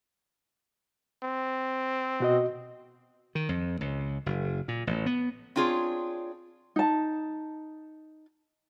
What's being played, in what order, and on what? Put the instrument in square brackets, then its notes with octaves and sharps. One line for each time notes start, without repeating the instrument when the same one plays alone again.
[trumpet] C4
[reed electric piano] B2 F#4 D#5
[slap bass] D#3
F2
C#2
F#1
A#2
A1
B3
[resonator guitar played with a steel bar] C4 D4 F4 G#4 C#5
[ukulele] D#4 A5